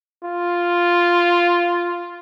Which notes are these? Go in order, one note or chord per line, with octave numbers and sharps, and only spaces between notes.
F4